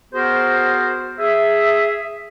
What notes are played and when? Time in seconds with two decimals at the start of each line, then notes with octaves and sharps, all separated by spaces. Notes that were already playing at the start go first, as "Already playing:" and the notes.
0.13 B3 F#4 G#4 A#4 C5
1.18 G#4 E5